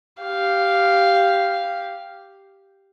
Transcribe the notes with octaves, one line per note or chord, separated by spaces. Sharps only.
G4 F5